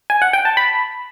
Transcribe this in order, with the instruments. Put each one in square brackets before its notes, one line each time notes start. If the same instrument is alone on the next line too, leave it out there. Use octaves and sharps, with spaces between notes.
[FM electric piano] G#5
F#5
G5
A5
B5